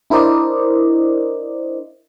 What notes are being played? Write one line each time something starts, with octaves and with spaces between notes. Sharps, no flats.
D4 E4 A#4 C5 D5 D#5